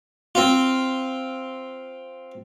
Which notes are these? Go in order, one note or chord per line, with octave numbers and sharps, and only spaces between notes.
C4 F4